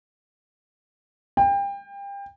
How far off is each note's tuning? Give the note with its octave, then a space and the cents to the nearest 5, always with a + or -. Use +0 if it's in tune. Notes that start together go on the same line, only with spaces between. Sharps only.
G5 +30